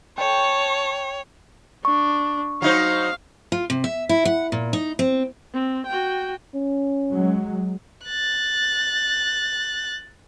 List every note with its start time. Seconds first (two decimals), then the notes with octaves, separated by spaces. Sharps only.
0.18 C#5 G5 A5 C#6
1.85 D4 C#6
2.62 F#3 D#4 C5 F5
3.52 F4
3.70 C3
3.84 E5
4.09 E4
4.25 F#5
4.52 A#2
4.73 D#4
4.99 C4
5.54 C4
5.87 F#4 G5
6.54 C#4
7.11 F#3 G#3
8.05 F#6 A6